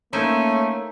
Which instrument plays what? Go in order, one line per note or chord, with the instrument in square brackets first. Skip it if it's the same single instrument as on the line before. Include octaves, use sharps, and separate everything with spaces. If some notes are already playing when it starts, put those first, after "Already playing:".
[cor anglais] A3 [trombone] A#3 [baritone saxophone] C#4 [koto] D#4 E4 C5